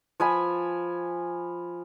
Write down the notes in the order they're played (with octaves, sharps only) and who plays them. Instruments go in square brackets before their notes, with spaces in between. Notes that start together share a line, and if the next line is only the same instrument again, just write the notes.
[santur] F3 G#5 B5